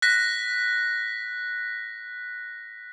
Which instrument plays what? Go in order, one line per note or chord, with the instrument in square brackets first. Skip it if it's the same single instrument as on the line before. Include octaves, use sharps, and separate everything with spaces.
[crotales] F#6 A#6 B6